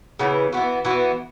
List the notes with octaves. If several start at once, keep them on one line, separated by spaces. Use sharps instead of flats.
C#3 E3 B3
E3 B3 F#4
E3 B3 F#4